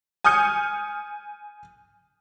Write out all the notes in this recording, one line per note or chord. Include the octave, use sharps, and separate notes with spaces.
G#5 D#6 F6 G6 C#7